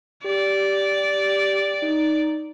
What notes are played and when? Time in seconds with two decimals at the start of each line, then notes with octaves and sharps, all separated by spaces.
0.24 G4 D5
1.82 D#4